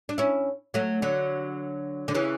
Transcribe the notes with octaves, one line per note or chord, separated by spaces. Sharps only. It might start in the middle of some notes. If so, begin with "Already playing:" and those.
D4
C#4 E4
F#3 A3
D3 F#3
D3
C#3 E3